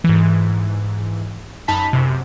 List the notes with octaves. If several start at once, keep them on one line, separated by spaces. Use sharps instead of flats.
G#2 E3
F#2 D#4 A5 B5 B6
F#2 C3